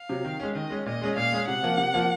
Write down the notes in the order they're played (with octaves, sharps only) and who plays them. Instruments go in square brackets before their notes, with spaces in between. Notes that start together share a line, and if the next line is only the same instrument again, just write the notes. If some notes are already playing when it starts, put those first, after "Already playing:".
Already playing: [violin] F5
[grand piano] C3 F#3
D#3
G#3 C#4
[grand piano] D#3 [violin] D#5
[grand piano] G#3 C#4
[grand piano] A#2 [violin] D#5
[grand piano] G#3 C#4 G#4
[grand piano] A#2 [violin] F5
[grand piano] G#3 C#4 G#4
[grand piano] C3 [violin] F#5
[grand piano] F3 A#3 F4
C3
F3 A#3 F4